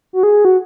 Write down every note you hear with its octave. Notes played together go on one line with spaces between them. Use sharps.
F#4
G#4
F#4